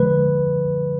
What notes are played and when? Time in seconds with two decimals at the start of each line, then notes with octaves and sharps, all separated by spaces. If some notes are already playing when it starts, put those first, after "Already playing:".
Already playing: D3 F3 G#3 B4